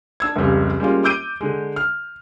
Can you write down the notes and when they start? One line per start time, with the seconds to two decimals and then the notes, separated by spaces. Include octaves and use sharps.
0.20 D4 E6 G#6
0.35 F1 C#2 C#3 G3 C#4
0.80 G3 G#3 A#3 C#4 F4
1.04 D6 E6 G6 D7 D#7
1.41 D3 G#3
1.76 F6